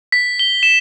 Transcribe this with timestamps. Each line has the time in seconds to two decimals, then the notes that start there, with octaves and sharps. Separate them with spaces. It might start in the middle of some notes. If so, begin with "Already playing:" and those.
0.12 B6
0.39 G7
0.63 E7